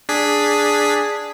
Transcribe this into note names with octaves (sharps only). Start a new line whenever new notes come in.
D4 G#4 B6